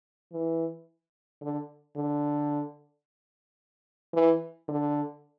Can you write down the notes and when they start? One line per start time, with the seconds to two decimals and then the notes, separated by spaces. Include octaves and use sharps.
0.32 E3
1.42 D3
1.97 D3
4.14 E3
4.68 D3